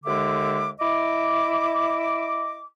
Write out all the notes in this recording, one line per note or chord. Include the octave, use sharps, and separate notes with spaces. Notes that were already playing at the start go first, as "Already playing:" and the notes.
D#2 D3 G#3 E5 D6
E4 D#5 D6